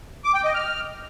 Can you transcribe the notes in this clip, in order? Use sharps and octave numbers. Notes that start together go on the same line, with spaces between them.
D6
G5
D#5
F6